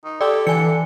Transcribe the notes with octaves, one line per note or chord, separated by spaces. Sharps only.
D#4
G4 A4 D5
D3 E3 G#5 C#7